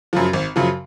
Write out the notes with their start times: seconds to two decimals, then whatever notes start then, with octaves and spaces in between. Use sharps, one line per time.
0.13 F#2 C#3 F3
0.33 G#1
0.56 F#2 C#3 F3